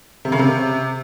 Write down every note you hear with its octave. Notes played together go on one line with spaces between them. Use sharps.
C3
C#3
C3